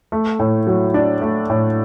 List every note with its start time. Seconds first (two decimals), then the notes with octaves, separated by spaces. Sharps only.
0.12 A3
0.39 A2
0.67 F#3
0.94 D4
1.21 A3
1.50 A2